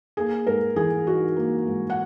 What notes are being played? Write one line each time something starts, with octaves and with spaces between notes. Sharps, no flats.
A#3 G#4
G#2 A#4
E3 G#4
D#4 F#4
A#3
G#2
F#5